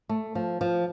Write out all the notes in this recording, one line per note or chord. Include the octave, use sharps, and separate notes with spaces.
A3
F3
F3